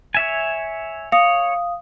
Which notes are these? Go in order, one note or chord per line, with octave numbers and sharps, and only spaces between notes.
C#5 E5 G#5
C#5 F5 D#6